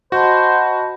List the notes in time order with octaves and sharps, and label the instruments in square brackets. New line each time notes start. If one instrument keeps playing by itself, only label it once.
[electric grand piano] F#4 [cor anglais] C5 [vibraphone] D#5 A5 B5